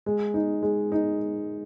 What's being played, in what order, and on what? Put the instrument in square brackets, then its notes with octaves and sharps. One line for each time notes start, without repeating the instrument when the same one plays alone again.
[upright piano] G#3
D#4
G#3
D#4